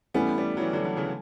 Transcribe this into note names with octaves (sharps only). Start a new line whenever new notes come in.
E3 G3 A3 B3 C#4 E4
G3 B3
F#3
E3 G3
D3 F#3
D3
C#3 E3